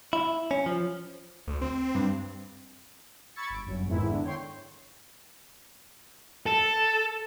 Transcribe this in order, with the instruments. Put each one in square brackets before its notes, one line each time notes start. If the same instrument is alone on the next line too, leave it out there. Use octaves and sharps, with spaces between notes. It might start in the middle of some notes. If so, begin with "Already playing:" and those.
[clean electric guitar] E4
C#4
F3
[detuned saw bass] D2
C4
[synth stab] G2
[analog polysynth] B5 C#6 E6 G#6 A6 C#7
G1 D7
G1 F#2
F2 G#2 D#3 G#3 B3 E4
D3
C#5 G5 C6
[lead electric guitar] A4